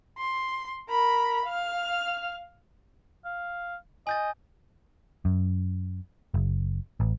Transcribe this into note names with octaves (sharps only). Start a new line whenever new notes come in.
C6
A#4 B5
F5 F6
F5
D#5 G#5 G6 A6
F#2
F#1
A1